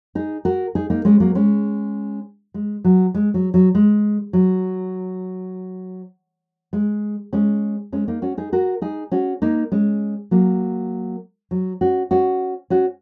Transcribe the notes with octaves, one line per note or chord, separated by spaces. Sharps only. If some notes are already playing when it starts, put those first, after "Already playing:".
D#4 G#4
F#4 A#4
D#4 G#4
A#3 D#4
G#3 C#4
F#3 A#3
G#3 C#4
G#3
F#3
G#3
F#3
F#3
G#3
F#3
G#3
G#3 C#4
G#3 C#4
A#3 D#4
C#4 F#4
D#4 G#4
F#4 A#4
D#4 G#4
C#4 F#4
A#3 D#4
G#3 C#4
F#3 A#3
F#3
C#4 F#4
C#4 F#4
C#4 F#4